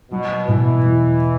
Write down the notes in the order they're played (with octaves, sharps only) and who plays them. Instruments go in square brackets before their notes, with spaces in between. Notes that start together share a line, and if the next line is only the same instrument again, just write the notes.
[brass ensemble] B2 [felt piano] F#3
[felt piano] B2 [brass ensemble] E3
[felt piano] E2